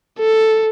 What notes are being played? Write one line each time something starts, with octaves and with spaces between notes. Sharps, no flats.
A4